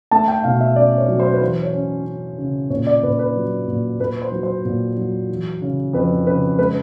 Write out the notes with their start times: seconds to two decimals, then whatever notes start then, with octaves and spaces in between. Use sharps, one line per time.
0.11 A3 A5
0.28 G5
0.44 B2 F5
0.61 E5
0.76 C#4 D5
0.98 C#5
1.08 F#3
1.20 C5
1.34 B4
1.42 E3 C5
1.63 C#5
1.74 C#4
2.06 C#4
2.38 C#3
2.70 A#2 C#5
2.87 D5
3.03 A#2 B4
3.19 B4
3.36 F#3
3.68 A#2
4.00 A#2 B4
4.22 C5
4.32 F#3
4.43 C5
4.65 A#2
4.97 F#3
5.29 E3
5.62 C#3
5.93 F2 B4
6.26 C#3 B4
6.59 G#3 B4